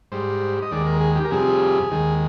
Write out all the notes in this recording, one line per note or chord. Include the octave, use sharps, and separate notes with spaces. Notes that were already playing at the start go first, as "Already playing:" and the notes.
G#2 G3 C5
D#5
D#2 D#3 G#3 D5
A#4
G#4
G4
A#4
F2 C3 G3 G#4
D#2 D#3 G#3